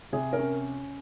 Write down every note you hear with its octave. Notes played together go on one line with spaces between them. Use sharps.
C3 G#4
A#4
C#4